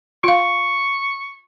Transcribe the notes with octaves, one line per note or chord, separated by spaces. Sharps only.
F4 F5 C#6